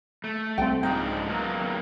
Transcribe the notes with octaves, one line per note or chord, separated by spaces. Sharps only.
A3
C2 C4 G5
G#2 F3 D4 D#4 G5
F#3 A#3 B3